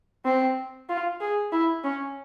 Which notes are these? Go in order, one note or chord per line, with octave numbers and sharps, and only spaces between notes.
C4
F4
G#4
E4
C#4